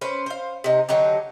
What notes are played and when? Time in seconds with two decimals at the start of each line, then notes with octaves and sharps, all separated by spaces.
0.01 C#4 B4 C5
0.26 C5 F5
0.64 C3 D#4
0.89 D3 F#3 D#4 G4